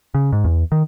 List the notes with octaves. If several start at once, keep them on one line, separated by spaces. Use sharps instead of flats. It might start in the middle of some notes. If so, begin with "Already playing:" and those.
C#3
G#2
E2
D#3